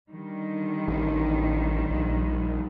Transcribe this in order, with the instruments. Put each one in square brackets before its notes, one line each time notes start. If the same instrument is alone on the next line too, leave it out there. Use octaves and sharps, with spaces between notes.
[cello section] D3 D#3 G3
[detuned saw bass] A1
A#1